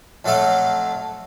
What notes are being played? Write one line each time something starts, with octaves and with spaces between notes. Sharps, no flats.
F2 F#3 A3 A4 F5